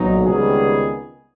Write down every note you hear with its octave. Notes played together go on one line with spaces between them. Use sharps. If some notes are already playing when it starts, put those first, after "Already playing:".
Already playing: B1 A#2 F#3 D#4
C#2 C3 D#3 G3 B3 G#4